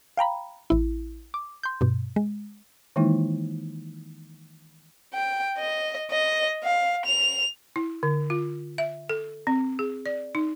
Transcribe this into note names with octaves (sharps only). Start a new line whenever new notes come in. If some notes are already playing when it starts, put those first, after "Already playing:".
F5 G5 A#5 B5
A1 E4
D6
C6 G6
G2 B2
G#3
D#3 E3 G#3 A#3 D#4 E4
G5
D#5
D#5
F5
F7
E4
D3
F4
E5
A4
C4
G#4
D5
D#4